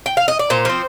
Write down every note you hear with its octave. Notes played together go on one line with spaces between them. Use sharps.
G5
F5
D#5
D5
A#2 C5
F3 C4